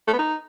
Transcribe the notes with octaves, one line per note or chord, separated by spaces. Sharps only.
A3
B3
D#4